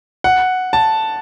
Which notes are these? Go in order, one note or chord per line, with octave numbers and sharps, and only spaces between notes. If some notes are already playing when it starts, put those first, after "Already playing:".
F#5
A5